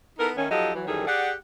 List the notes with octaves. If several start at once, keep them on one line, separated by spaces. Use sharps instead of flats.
B3 D#4 E4 A4 A#4
D#3 A3 C#4
F3 F#3 D#4 G4 A4 D#5
E3 F#3
F#2 D#3 E3 G3 G#4 A4
G4 G#4 D5 F#5